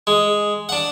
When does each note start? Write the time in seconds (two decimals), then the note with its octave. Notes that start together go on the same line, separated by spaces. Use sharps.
0.07 G#3
0.69 D4 F#5